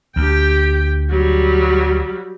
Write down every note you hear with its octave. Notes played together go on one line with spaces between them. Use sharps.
D2 G4 G5
F#3 G3